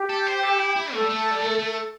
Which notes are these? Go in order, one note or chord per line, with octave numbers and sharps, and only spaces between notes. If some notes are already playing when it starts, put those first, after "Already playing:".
Already playing: G4
A4
C5
A4
E4
E4
A3 A4
G3
A3
G3
A3
A3